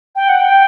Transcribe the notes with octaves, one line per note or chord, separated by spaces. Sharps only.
G5
F#5
G5